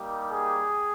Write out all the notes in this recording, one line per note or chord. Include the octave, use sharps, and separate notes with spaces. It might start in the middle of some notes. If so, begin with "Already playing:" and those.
Already playing: G3 A#3 D#4 G4
G#4